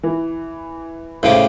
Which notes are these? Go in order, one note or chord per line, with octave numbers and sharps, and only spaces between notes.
E3
A2 C#3 G4 C5